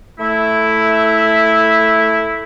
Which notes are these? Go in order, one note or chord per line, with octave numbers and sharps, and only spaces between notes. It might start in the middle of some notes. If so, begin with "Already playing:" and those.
A3 E4